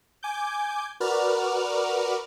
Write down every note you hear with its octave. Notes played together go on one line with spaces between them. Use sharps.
G#5 D6 G6
F#4 A#4 B4 D5 F6